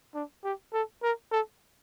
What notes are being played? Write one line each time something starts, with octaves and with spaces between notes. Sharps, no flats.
D4
G4
A4
A#4
A4